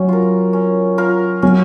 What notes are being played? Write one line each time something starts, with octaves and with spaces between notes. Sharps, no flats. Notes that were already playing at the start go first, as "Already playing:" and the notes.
Already playing: F#3 C#4
F4 A#4
C#4
F4 A#4
F#3 C#4